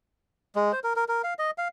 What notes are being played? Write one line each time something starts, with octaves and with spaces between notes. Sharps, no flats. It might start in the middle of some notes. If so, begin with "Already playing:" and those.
G#3
C5
A#4
A#4
A#4
F5
D#5
F5